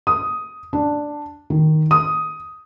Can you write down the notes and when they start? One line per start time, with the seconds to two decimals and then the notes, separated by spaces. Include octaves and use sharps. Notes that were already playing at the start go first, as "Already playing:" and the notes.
0.07 D#6
0.73 D4
1.50 D#3
1.91 D#6